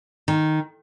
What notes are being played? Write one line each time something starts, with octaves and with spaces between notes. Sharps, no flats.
D#3